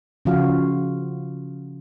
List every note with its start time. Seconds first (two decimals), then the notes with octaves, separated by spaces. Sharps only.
0.25 C#3 F3 F4 F#4 F5